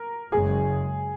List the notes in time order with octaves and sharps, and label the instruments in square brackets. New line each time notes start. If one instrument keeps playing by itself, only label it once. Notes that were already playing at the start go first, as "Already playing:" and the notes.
Already playing: [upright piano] A#4
[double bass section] F#1 F#2 C#3 G#3 [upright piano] G#4